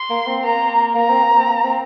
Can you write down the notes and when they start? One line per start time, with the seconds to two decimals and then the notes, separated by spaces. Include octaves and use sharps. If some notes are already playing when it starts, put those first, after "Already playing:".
Already playing: C6
0.10 A#3
0.27 C4
0.45 A#3 A#5
0.95 A#3 A#5
1.10 C4
1.23 A#3
1.37 C4
1.50 A#3
1.64 C4